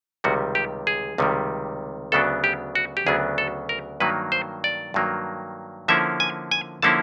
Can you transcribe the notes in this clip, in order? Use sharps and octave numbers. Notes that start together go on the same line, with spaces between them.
C#2 C3 D#3 G3 F#4
G4
G#4
C#2 C3 D#3 G3
D2 C#3 F#3 B3 D4 A4
G4
F#4
G4
D2 C#3 F#3 B3 D4 G#4
A4
A#4
G2 D#3 F#3 A#3 B4
C5
D5
G2 D#3 F#3 A#3
D3 F3 A#3 C#4 E4 E5
G#5
G#5
D3 F3 A#3 C#4 E4 A5